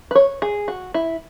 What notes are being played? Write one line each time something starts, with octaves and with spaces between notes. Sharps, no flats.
B4
C#5
G#4
F#4
E4